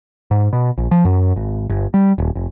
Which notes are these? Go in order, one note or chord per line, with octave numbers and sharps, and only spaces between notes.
G#2
B2
A#1
F3
F#2
G#1
G1
G3
D#1
F1